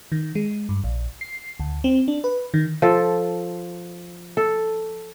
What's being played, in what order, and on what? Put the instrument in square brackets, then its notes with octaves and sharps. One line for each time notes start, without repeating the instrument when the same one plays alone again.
[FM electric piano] D#3
G#3
G2
A#1
C7
D2
C4
D4
B4
D#3
[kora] F3 A4
A4